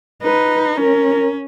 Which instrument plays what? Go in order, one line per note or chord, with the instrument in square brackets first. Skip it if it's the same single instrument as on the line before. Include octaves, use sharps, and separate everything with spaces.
[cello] D#4 [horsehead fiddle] B4
[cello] C#4 [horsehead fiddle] A#4